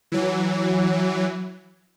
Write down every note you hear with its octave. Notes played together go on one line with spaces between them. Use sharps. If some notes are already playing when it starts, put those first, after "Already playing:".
E3 F#3